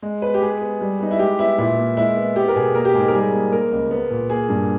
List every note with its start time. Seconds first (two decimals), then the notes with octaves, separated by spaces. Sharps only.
0.02 G#3
0.22 B3 B4
0.34 G4
0.42 G#3 G#4
0.61 B3
0.81 G3
1.00 B3 D#4
1.11 E4
1.19 G#3 G4
1.39 B3 E4
1.58 A#2 E4
1.77 A#3
1.97 G#3 E4
2.17 B3
2.36 B3 G4
2.48 A#4
2.56 B2 G#4
2.75 A#3 A#4
2.85 G4
2.94 G#2 G#4
3.08 A#4
3.13 G3 G#4
3.33 A#3
3.52 A#3 A#4
3.72 C#2
3.91 B3
4.10 A#2
4.30 A#3 G#4
4.49 G2